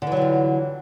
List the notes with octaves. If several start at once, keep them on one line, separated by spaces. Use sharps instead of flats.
D3 E3 F#3 G3 F4